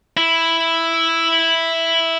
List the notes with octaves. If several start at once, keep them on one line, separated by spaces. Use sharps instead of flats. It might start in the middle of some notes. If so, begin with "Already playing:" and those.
E4